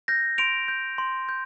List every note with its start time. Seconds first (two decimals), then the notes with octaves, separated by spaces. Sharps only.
0.08 F6 G6 A#6
0.38 C6 D7 F7
0.68 G6
0.98 C6
1.29 G6